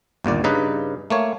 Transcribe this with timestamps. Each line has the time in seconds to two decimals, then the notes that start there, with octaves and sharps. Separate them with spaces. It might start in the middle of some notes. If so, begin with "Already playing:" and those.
0.24 G1 D#2 A#2 D5
0.44 G2 C#3 D#4 B4
1.10 A3 A#3 C#5